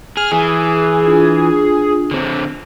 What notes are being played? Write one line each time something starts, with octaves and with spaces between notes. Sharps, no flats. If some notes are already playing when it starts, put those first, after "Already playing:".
G#4 F6
E3 G#4
D4 F4
D3 C4